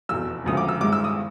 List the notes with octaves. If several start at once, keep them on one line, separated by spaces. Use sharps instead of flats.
F1 E2 B2 E6
E1 D2 C#3 F3 D#6
D6
E6
G#1 G2 E3 G#3 D6
E6
D#6